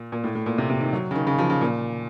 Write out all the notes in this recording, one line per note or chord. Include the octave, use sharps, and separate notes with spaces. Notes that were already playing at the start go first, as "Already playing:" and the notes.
Already playing: A#2
A#2
A2
A2
A#2
C3
C3
D#3
F#3
C#3
D#3
C#3
F3
C#3
A#2